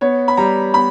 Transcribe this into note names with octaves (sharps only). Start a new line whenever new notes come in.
B3 C#5
B5
G3 A#5
B3 B5